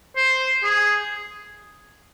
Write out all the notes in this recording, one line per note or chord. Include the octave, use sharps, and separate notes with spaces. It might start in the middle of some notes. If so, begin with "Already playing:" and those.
C5
G#4